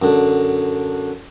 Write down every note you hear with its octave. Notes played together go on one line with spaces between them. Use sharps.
F#2 D3